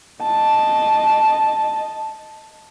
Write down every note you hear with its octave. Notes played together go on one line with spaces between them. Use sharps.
D#5 A5